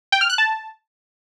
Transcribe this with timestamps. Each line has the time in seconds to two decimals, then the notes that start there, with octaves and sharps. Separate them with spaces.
0.12 G5
0.21 F6
0.30 F#6
0.38 A5